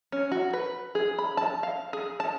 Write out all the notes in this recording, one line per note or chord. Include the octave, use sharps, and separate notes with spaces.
C#4
F#4
B4
G#4
B5
A5
F5
G#4
A5